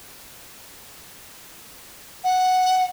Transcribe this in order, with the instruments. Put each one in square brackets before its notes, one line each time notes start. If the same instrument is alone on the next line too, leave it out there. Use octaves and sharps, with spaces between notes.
[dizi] F#5